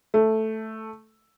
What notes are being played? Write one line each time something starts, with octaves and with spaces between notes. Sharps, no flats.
A3